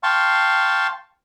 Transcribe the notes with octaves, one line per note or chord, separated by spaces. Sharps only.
F5 G5 A5 C6 C#6